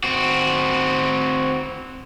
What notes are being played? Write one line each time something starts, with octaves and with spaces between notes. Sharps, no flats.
C4 F#4